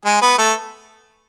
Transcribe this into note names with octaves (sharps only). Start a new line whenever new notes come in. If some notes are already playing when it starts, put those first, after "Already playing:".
G#3 G#4
B3 B4
A3 A4